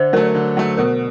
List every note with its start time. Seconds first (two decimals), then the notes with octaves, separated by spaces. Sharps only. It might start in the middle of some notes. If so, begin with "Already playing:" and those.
Already playing: D3 C5
0.13 F#3 A3 A#4
0.35 D3
0.57 F#3 A3
0.78 B2 A#4